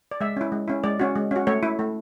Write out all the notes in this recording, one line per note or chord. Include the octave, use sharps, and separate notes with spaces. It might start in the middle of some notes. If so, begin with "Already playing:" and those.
D5
G#3 E5
C#4 E4
G#3
C#4 E4
G#3 D5
C#4 F#4
G#3
C#4 F#4
A3 C#5
E4
A3